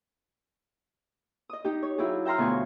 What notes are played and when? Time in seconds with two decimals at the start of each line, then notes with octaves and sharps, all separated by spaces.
1.49 D#5 D#6
1.64 D#4 G4
1.83 C#5
1.98 F#3 E4 F4 G4 G#4
2.25 E5 G5 A#5 C6 F6
2.38 D2 B2 F3 A3 G#5 C#6